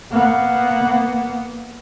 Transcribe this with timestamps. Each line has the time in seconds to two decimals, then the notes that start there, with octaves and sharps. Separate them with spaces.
0.12 A#3 B3